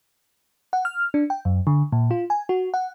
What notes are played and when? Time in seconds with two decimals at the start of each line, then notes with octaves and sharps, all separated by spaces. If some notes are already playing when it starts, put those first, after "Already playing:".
0.73 F#5
0.85 F6
1.14 D4
1.30 G5
1.45 F#2
1.67 D3
1.92 A#2
2.11 F4
2.30 G#5
2.49 F#4
2.74 F#5